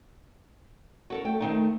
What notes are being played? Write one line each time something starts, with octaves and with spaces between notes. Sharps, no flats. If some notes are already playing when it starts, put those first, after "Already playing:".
F#4 A4 A#4
A3 G5
D#3 C4 D#4